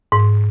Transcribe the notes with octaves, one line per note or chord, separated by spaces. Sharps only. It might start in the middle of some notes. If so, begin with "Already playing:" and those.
G#2